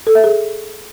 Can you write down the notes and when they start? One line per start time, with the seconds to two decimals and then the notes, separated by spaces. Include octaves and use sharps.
0.07 A4
0.15 E5
0.24 G#4